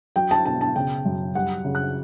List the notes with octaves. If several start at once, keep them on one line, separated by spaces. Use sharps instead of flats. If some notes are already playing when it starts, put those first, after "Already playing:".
F#3 G5
A5
B2 A5
A5
C#3 G5
F#2
G3 F#5
C#3
F#6